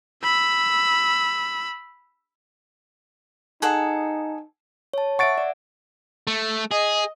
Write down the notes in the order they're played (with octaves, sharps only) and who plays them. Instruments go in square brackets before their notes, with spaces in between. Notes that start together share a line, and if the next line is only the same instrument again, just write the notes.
[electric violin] B5 E6
[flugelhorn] D#4 [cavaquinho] G#4 A4 F#5
[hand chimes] C#5 A5
[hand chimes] E5 F#5 [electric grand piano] C#6 A6 D7
[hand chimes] D5
[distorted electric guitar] A3
[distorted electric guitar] G#4 [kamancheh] D#5